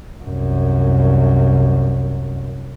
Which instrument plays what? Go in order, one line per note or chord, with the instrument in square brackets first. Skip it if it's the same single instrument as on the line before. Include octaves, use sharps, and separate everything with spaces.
[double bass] C2 F#2